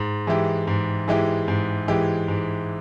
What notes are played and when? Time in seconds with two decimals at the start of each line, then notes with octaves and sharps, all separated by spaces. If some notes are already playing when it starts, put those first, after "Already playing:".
Already playing: G#2
0.27 E3 G#3 E4 G4
0.67 G#2
1.08 E3 G#3 E4 G4
1.48 G#2
1.88 E3 G#3 E4 G4
2.28 G#2